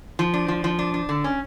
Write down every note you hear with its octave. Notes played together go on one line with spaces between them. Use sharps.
F3
D4
F3
F3
D4
D4
D3
C#4